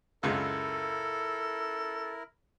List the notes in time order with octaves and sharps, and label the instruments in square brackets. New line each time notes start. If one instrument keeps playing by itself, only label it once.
[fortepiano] C#2 F#2 G#3 [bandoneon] E4 A#4 [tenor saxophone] A4